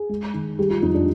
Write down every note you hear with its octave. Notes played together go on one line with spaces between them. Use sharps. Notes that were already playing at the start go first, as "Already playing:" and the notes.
Already playing: G#4
G#3
D#3
G3 G4
F4
F2 D#4
D4